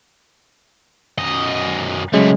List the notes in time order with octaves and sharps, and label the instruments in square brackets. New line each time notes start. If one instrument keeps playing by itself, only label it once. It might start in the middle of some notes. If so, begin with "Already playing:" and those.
[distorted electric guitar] F#2 D#5
[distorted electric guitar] C#3 A3 [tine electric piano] F#3 G#3 C#4